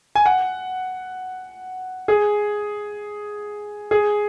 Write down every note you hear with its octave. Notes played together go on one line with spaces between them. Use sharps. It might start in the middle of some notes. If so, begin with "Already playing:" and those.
G#5
F#5
G#4
G#4